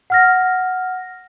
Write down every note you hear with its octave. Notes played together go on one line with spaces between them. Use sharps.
F#5 F6 A#6